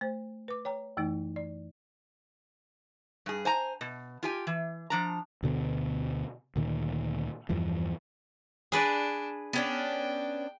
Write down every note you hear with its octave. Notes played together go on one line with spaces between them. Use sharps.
A3 C5
B4 D6
C#5 G5 A#5
F#2 E3 A3 D#4
D5
G2 G#4
C5 G#5 A#5
B2
F4 G4 G#5
E3
F3 D4 A#5
D2 B2 D3 B3
D2 A#2 D#3
E2 G2 E3 F3
D4 G#4 B4 D5
B3 C#4 D4 G5